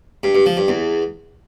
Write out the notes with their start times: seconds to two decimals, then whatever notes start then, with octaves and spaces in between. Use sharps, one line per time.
0.23 G2
0.35 G2
0.46 F3
0.57 G2
0.68 E2